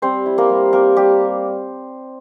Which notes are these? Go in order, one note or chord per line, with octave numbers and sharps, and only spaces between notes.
G3 C4 C5
E4
A#3 A#4
G3
A#3 C4 A#4
G3 G4